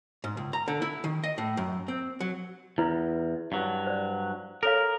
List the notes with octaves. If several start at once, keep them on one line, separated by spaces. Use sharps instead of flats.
G#2
C#2
A#5
D3
E4
D#3
D#5
A2
F#2
C4
F#3
E2 E4 F4 B4
G2 F#3
C5 D5
A4 A#4 C#5 F5